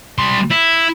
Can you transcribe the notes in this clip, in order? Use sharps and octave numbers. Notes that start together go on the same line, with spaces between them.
G3 C6
E4